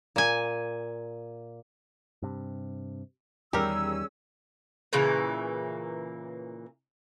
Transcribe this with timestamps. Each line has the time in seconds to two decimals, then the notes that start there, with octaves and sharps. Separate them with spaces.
0.16 A#2 G#5
2.22 G2 C3
3.53 E2 D#3 G3 C#4 G4 G#4 A#4 E6
4.93 A#2 C#3 E3 A#3